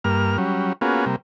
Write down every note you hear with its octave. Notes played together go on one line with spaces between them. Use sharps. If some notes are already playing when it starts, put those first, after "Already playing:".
G2 A#3 F6
F#3 G3 C#4
A#3 B3 C#4 F4 F#4 G#4
C3 G3 A#3